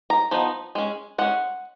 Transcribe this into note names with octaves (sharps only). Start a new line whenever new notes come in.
A#5
F3 B3 D#4
G#3 C#4
G#3 C#4 F#5